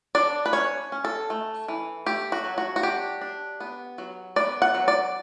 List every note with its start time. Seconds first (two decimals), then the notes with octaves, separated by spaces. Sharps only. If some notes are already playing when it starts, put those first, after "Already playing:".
0.15 D4 D5
0.46 B4
0.53 C#4 C#5
0.92 C#4
1.05 A4
1.30 A3
1.68 E3
2.06 A3 G4
2.32 F#4
2.44 F#3
2.58 F#4
2.76 F#4
2.83 D4 G4
3.21 D4
3.60 B3
3.98 F#3
4.36 B3 D5
4.62 F#5
4.75 F#3
4.88 D5